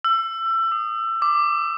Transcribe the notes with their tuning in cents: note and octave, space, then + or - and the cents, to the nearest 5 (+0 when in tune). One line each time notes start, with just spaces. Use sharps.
E6 +25
D#6 -25
D6 +10